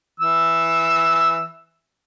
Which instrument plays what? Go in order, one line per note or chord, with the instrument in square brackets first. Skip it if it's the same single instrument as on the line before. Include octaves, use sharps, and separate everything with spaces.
[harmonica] E3 E6